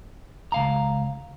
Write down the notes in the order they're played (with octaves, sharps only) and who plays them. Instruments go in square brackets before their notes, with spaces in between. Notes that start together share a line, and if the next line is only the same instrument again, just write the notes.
[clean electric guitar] C#2 F5 A#5